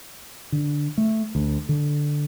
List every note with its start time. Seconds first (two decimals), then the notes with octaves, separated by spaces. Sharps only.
0.52 D3
0.98 A3
1.35 D2
1.69 D3